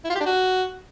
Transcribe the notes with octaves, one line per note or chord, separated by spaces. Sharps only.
E4
F4
G4
D4
F#4